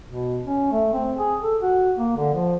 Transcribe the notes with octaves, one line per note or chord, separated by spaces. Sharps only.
B2
C#4
A3
C4
G#4
A4
F#4
A#3
D3
F3